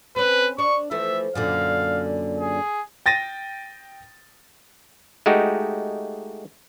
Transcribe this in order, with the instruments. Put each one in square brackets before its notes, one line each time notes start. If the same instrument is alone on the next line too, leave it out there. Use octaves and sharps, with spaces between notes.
[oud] C4 C#4 [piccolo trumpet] B4
[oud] D4 [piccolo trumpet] C#6
[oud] E3 F3 A3 [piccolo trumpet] E5
[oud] F#2 A#2 D3 [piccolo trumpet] F5
[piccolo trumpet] G#4
[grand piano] G5 A6 A#6 D#7
[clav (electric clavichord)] G#3 A3 D#4 F#4 G4